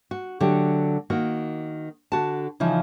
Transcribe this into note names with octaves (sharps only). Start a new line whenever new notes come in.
F#4
D3 F#3 A3 G4
D#3 A#3 F#4
D3 F#4 A5
C#3 E3 F3 D#4